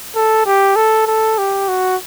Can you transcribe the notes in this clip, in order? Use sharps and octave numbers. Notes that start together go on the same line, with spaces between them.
A4
G4
A4
A4
G4
F#4